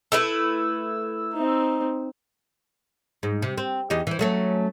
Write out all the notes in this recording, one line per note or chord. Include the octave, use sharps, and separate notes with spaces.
A3 E4 B4 E6
C4 D#4
G#2
C3
C4
E2 D#4 G4
E3 C5
F#3 A3 C#4